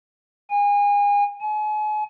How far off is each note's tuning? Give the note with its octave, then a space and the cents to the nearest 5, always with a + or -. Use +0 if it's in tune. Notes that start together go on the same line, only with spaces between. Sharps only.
G#5 -30
G#5 +40